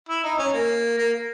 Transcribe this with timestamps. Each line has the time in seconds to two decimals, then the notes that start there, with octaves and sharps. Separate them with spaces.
0.09 E4
0.24 D#4
0.38 C#4
0.54 A#3
0.98 A#3